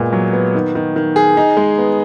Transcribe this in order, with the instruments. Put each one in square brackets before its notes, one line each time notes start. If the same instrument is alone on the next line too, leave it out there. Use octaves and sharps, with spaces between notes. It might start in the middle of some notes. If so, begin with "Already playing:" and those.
Already playing: [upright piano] A#2 G#3 B3
F#3
B3
D#3
D#3
D#3
G#4
D#4
G#3
B3